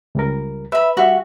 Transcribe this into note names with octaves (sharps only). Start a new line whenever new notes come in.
C#2 G3 A#4
B4 E5 B5
G3 F#4 G4 E5